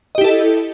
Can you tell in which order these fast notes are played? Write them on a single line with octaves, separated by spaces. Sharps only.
D#5 G4 E4 A4